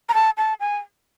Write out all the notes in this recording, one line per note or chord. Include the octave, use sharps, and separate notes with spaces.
A#5
A5
A5
G#5